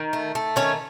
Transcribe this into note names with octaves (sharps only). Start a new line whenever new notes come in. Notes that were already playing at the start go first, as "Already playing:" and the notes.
Already playing: D#3
A3
A3
D#3 C#4 C#5